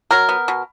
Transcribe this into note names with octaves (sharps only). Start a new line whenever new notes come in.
F#3 A#4
B3
B2